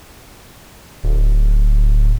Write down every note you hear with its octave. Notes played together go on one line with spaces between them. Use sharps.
D1